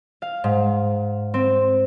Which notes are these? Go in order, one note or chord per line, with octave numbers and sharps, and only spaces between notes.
F5
G#2
C4